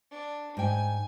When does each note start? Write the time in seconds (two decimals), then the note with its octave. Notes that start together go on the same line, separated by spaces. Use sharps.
0.11 D4
0.57 G#2 G5 G#5